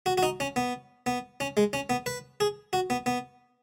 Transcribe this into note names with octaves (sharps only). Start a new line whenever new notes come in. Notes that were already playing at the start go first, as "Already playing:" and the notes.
F#4
F#4
D#4
C#4
B3
B3
C#4
G#3
C#4
B3
B4
G#4
F#4
B3
B3